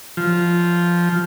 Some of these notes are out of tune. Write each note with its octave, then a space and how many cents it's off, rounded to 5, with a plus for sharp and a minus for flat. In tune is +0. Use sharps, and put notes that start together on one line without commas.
F3 -5